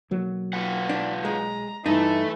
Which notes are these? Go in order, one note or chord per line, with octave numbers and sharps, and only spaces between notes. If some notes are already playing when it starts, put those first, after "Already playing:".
B1 F#3 A#3
F4 B4 F#5
D4
G#3 A#5
G2 E3 A3 D#4 A4